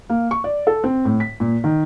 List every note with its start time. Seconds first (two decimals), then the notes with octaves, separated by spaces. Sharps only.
0.09 A#3
0.31 C#6
0.44 D5
0.67 A4
0.84 C4
1.05 A2
1.20 B6
1.40 A#2
1.64 D#3